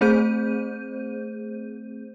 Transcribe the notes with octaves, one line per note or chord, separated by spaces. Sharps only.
A3 C4 G#4 C5 G6 D#7